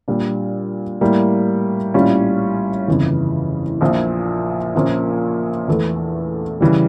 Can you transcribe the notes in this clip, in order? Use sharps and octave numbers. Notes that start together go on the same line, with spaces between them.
A#2 G3 D4
A2 G3 A#3
A#1 A2 G3 C#4 F4
G1 F2 C#3 E3
A#1 A#2 F3
A#1 A#2 F3 A#3 C#4
E2 E3 A3
C#3 E3 G3